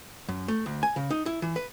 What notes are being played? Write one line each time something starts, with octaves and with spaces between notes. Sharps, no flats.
F#2
A3
D2
G#5
C#3
D#4
E4
E3
B4